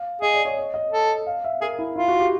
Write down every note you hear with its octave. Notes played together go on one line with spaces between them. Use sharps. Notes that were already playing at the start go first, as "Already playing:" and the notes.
Already playing: F5
G#4 D#5
D5
C#5
D#5
D#5
A4
F5
E5
G#4 A#4
E4
E4 F4
F#4
G4